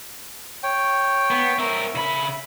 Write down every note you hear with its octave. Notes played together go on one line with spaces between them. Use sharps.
C#5 G5
B3
C4 A#4 E5
C#3 B5